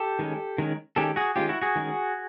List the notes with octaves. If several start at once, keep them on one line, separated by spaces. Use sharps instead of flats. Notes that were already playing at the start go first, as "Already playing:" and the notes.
Already playing: G4 A4
D#3 G#3 C#4
D#3 G#3 C#4
D#3 G#3 C#4 G4 A4
F#4 G#4
D#3 G#3 C#4 F4 G4
E4 F#4
F#4 G#4
D#3 G#3 C#4